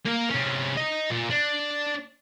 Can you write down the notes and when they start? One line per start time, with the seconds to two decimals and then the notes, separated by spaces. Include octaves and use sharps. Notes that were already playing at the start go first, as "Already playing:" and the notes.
0.06 A#3 A#4
0.30 C3 C#4
0.77 D#5 A#5
1.10 A#2
1.30 D4